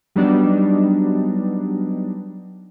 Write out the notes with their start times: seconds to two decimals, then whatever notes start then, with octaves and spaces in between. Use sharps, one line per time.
0.16 F#3 G3 B3 D4 D#4